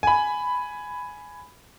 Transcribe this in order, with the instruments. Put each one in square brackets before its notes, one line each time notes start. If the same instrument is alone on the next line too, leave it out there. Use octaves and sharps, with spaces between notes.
[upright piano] G#5 B5